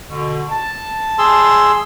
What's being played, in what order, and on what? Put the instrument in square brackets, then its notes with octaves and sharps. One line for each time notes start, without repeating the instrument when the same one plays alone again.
[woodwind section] B2 D3
A5
[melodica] G#4 C6 E6